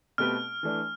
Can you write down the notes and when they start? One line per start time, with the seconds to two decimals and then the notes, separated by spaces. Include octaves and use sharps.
0.18 B2 A3 C4 G4 B4 F6
0.63 E3 A3 D4